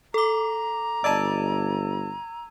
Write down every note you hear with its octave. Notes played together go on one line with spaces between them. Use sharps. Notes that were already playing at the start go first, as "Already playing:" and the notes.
A4 A#5 D6
G1 D5 D#5 A5 E6 G#6 D#7